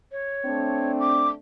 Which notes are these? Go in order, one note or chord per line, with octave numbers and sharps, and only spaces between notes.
C#5
A3 C4 D4
D6